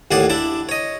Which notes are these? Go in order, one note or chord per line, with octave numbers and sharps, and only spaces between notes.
D#2 A2 G#4 D5 F#5
D4 E4 D5
C#5 D#5